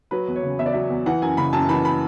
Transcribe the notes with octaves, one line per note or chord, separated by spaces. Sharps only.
F#3 B4
E2
C#5
C#3
E2 E5
D5
F#3 E5
E2
E3 F#5
F#2 G#5
C#3 B5
F#2 A5
E3 B5
B5